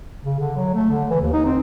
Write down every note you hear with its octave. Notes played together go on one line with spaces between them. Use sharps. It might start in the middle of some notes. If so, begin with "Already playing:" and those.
C#3
D3
F#3
A3
D3
E3
D#2
D#4
C4